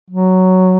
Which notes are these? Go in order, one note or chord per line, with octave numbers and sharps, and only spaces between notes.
F#3